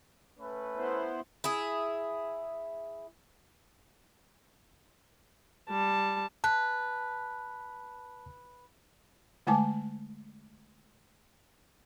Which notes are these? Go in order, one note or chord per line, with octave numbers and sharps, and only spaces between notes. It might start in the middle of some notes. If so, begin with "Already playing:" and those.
A3 C#4 B4
B3 E4 C5
E4 G#4
G3 A5
B4 A5
D3 G#3 A3 G#5 A5 D6